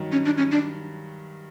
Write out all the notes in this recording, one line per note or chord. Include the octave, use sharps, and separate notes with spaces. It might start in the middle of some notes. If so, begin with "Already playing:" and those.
Already playing: G2 D#3 F#3
C#4
D4
C#4
D4